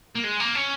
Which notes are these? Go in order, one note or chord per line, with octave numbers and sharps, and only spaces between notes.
A#3
G#3
A#3
C#4